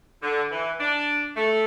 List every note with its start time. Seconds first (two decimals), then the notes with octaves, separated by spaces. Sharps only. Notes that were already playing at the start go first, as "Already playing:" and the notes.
0.23 D3
0.52 E3
0.80 D4
1.37 A3